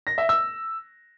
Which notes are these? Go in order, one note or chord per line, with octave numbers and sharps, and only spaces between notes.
A#6
E5
E6